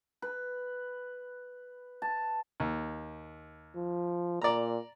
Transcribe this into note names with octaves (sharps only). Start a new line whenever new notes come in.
B4
A5
D#2
F3
A#2 D5 A#5